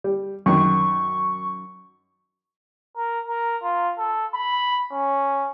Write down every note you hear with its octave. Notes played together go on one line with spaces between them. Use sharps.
G3
F#2 D#3 C#6
A#4
A#4
F4
A4
B5
C#4